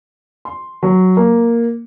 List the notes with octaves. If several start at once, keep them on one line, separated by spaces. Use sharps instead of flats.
C6
F#3
A#3